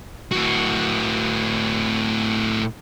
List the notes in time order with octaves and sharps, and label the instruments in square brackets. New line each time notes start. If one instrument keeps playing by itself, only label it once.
[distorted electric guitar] A2 F#4